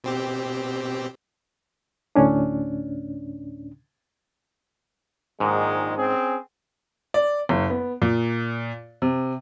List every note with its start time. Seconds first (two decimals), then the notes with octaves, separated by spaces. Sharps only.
0.04 B2 C4 G4
2.16 D2 A2 C#4 D4
5.40 A#1 G#2 D#3 G#3
5.96 C4 C#4 G#4
7.14 D5
7.49 F#1
7.70 B3
8.02 A#2
9.02 C3